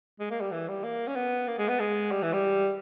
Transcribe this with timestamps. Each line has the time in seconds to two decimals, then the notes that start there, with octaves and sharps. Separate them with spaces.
0.20 G#3
0.31 A#3
0.41 G3
0.52 E3
0.68 G3
0.83 A#3
1.07 C#4
1.16 B3
1.47 A#3
1.58 G#3
1.68 B3
1.80 G#3
2.11 G3
2.22 E3
2.33 G3